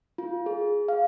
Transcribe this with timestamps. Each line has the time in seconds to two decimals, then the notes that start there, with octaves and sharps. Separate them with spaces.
0.18 F4
0.46 G#4
0.88 F5